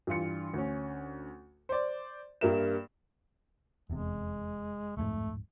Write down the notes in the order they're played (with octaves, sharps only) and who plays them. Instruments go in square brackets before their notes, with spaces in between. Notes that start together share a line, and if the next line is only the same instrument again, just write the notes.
[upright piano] G2 E3 F4 C#7
D2 C#4
C5 D5
G2 G3 A#3 A#4 E5 E7
[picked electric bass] F1 E2 C3 [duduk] G#3
[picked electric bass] D1 F2 G#2 [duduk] A3